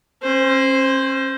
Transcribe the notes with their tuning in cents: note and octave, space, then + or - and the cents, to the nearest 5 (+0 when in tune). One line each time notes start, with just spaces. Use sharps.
C#4 -40 C5 +0